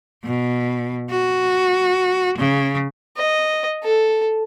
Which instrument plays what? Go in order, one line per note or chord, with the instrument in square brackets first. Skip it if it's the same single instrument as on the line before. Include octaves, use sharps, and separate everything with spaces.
[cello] B2
F#4
C#3
[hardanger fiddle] D#5
A4